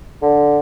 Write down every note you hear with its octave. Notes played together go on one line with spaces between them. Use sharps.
D3